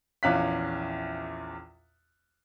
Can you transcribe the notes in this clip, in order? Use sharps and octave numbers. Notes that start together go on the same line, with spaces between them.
A#1 E2 C#4 F5 F#6 B6